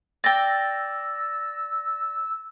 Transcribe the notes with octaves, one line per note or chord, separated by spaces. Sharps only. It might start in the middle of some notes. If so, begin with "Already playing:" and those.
D5 G5 E6 A6 A#6